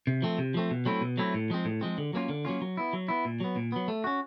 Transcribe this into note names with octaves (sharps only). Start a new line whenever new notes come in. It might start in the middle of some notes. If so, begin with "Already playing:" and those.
C3
F3 A3 C4
C3
F3 A3 C4
B2
F#3 A3 C4 E4
B2
F#3 A3 C4 E4
A2
F3 G#3 C4
A2
F3 G#3 C4
D3
F#3 A#3 C#4 F4
D3
F#3 A#3 C#4 F4
F#3
B3 E4
F#3
B3 E4
A#2
F#3 B3
A#2
F#3 B3
A3
C#4 F#4